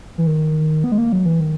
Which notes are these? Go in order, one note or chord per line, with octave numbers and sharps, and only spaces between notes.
E3
D#3
B3
G#3
A#3
F#3
E3
D#3